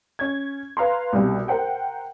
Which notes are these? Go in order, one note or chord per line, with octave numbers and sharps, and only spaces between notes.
C#4 G#6
B4 F5 A#5 C6
C2 B2 G3
A#4 C5 F#5 G5